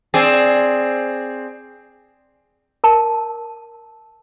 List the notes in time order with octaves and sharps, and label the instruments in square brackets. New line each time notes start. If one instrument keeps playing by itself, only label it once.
[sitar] C4 G#4 D5
[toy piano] A#4 A5